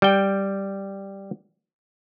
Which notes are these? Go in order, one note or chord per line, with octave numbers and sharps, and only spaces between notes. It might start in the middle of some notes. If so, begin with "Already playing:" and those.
G3 G5